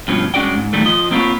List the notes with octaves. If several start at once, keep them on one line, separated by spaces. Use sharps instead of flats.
G2 B2 F3 C#4
G2 G#3 C#4 F#4 D5 G5
G#2
A#2 D#3 F#3 G3 A3
F3 D#5
A#3 C4 F4 G4 B4 C#5